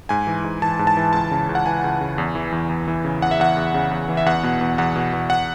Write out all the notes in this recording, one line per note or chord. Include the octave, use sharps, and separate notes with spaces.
G#2 G#5
E3
G#2
E3 A5
G#2
A5
E3
C#2 A5
C#3
C#2
F#5
E3 G#5
C#2
C#3
E2
E3
E2
E2
E3
C#3
E2 F#5
E5
E2 F#5
E2
C#3
E2
E3
E5
E2 F#5
B2
E2
E2 F#5
B2
E2
F#5